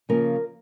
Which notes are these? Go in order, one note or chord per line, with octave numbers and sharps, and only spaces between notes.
C#3 F3 A#3 A#4